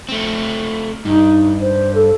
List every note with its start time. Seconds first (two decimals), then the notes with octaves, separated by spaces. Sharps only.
0.09 A3 C4
1.05 G2 D#4
1.61 C5
1.95 A4